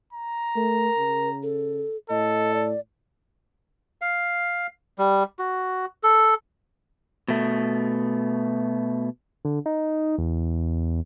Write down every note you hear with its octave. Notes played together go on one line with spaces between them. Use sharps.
A#5
A3 A#4
C#3
A4
A2 A4 D#5
D5
F5
G3
F#4
A4
B2 A3
D3
D#4
E2